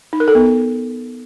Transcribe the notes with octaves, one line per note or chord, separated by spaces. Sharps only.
D#4
A#4
A4
B3